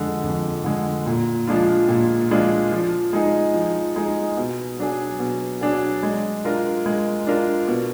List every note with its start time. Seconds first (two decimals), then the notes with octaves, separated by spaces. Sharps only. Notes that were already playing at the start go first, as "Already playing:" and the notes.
Already playing: F2 D3 G#3
0.23 F2
0.64 D3 G#3
1.06 A#2
1.47 F3 G#3 D4 F4
1.88 A#2
2.31 F3 G#3 D4 F4
2.72 F3
3.13 G#3 D#4 G#4
3.54 F3
3.96 G#3 D#4 G#4
4.37 B2
4.79 F#3 D4 G#4
5.19 B2
5.61 F#3 D4 G#4
6.03 G#3
6.45 D4 F4 A#4
6.86 G#3
7.27 D4 F4 A#4
7.68 B2